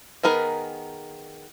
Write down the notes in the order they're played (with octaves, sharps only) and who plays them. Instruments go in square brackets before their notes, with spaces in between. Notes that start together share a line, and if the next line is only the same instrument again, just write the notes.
[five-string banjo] D#3 B3 G#4 A#4 B4